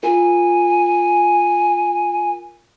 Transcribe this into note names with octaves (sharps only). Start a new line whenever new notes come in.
F4 A#4 G#5